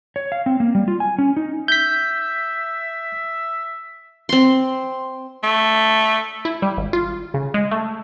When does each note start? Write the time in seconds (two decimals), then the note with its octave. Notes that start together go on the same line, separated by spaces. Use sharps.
0.16 C#5
0.32 F5
0.46 C4
0.60 A#3
0.75 G3
0.88 F4
1.00 G#5
1.18 C#4
1.37 D#4
1.68 E5 G6 B6
4.29 C4 C6
5.43 A3
6.45 E4
6.62 G3
6.78 G#1
6.93 F4
7.34 C#3
7.54 G#3
7.71 A3